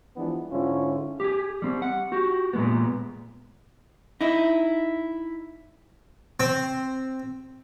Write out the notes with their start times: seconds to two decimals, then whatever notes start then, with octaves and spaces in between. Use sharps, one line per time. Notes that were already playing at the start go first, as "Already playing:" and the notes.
0.16 E3 F3 G3 G#3 B3 D4
0.50 G#2 D3 C#4 E4 F4
1.20 G4 G#4
1.62 G3 C4
1.82 F#5
2.12 F#4 G4
2.53 A#2 G#3 B3
4.21 D#4 E4
6.40 C4